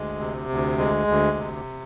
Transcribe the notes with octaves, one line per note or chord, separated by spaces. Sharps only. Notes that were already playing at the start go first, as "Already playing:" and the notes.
Already playing: D2 G#3
C3
D2
G#3
D2
C3